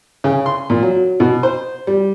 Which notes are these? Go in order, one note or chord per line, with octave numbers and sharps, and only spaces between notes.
C#3
C6
A#2
F#3
B2
C5
G3